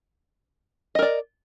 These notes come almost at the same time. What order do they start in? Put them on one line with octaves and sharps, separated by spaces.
D#5 A#4 D5